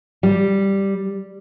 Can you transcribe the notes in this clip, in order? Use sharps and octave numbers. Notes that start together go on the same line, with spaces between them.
G3